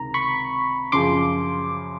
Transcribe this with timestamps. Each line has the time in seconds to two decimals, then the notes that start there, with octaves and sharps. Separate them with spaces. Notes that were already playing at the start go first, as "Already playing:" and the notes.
Already playing: C#2 C3 D#3 A#5
0.14 B5 C#6
0.92 F#2 C#3 F3 C6 D6